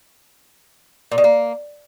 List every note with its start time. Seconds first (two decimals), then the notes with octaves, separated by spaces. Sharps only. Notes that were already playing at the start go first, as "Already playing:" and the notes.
1.11 A#2
1.18 B2
1.24 A#3